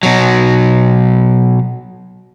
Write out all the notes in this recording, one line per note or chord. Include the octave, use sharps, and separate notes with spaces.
B2 F#3